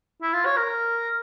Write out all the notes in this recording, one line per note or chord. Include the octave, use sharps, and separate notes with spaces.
E4
F4
C#5
A#4